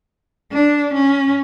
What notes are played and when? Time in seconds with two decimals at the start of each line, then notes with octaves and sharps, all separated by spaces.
0.53 D4
0.95 C#4